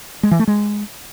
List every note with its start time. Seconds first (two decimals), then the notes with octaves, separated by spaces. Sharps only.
0.23 G#3
0.31 E3
0.39 A3
0.47 G#3